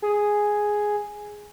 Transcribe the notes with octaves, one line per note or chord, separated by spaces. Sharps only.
G#4